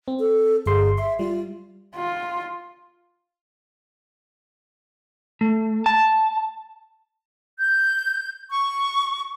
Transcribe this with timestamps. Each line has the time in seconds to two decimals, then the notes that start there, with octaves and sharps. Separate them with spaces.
0.08 C4
0.19 A4
0.66 G1 G#4 C6
0.98 E5 C6
1.19 G3 F4
1.96 F4
5.41 A3
5.86 A5
7.58 G6
8.50 C#6